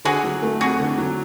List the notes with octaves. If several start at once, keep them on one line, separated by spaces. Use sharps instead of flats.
D3 F#4 G#4
F#3
A3
F2 F#4 G#4
D3
F#3